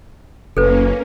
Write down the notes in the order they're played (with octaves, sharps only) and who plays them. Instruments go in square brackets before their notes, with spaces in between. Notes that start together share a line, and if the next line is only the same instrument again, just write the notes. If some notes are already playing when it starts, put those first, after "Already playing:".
[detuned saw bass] F#1 [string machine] A#3 C#4 [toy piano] A4 B4